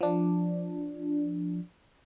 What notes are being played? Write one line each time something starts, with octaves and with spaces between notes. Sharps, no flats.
F3 D4